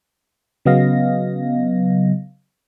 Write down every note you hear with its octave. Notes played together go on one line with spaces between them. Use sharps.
C#3 F#3 B3 D#5 F5 A#6